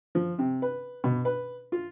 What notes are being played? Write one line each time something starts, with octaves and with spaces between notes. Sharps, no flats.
F3
C3
B4
B2
B4
F4